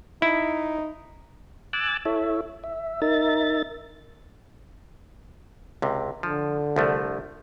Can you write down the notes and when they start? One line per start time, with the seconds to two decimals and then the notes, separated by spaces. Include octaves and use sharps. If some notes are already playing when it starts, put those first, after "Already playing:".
0.22 D#4 E4
1.73 G#5 D6 E6 F#6 A6
2.05 E4 A4 C#5 E5
2.64 E5
3.02 D#4 A#4 E5 A6
5.82 C#2 C3
6.23 D3 F3
6.76 C2 F3 A3